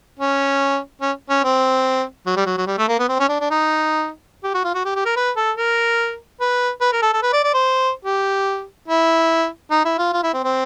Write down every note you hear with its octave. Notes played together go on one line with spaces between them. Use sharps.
C#4
C#4
C#4
C4
F#3
G3
F#3
F#3
G3
A3
A#3
B3
C4
C#4
D4
D4
D#4
G4
F#4
F4
F#4
G4
G4
A#4
B4
A4
A#4
B4
B4
A#4
A4
A4
B4
D5
D5
C5
G4
E4
D#4
E4
F4
F4
E4
C4
C4